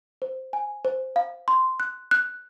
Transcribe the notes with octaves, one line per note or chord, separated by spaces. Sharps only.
C5
G#5
C5
F5
C6
F#6
F#6